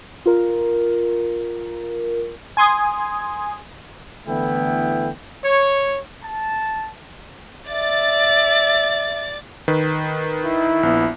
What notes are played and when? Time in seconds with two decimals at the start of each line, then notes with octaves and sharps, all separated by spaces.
0.26 F4 A#4
2.57 G#5 C6 D#6 G#6
4.27 D3 E3 A3 B3 E4 G5
5.44 C#5
6.22 A5
7.69 D5 E5 A6
9.68 D#3 B4
10.45 E4
10.83 A#1 B3